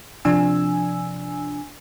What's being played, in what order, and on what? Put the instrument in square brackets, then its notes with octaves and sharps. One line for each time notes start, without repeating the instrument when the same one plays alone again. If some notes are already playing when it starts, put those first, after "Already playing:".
[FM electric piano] C3 F3 D4 G#5 E6